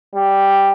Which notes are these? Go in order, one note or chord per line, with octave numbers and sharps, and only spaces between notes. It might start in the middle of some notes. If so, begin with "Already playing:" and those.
G3